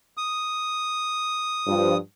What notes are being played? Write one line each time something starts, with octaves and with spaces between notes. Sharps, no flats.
D#6
G2 F3